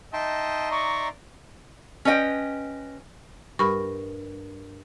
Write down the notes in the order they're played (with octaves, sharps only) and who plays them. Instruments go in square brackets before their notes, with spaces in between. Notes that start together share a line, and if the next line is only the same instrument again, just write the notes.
[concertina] D#4 E5 C6 [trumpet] D#5 [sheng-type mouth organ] G5 A5
[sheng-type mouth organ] D5 A#5 [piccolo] C#6
[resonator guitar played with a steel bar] C#4 B4 D#5 G5
[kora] G2 [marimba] A#4 [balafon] B5 C#6